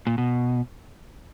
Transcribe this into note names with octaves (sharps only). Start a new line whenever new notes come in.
A#2
B2